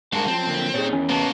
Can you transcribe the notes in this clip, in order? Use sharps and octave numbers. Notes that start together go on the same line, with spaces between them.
G2 G#3 F#4 A#4 A5
F#2 F3 C4
D3 A#3
A#2 D#4 G#4 A4 C#5
E2 D#3 C#4 E4
A#3 B3 F#4 A5